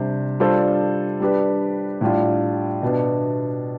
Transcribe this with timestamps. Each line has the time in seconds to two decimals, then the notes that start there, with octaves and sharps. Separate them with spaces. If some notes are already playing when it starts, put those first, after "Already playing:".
Already playing: C3 G3 D4 G4 C5
0.40 G3 D4 F4 A4 C5
1.20 G3 D4 G4 B4
2.01 A2 G3 D4 F4
2.82 B2 B3 D4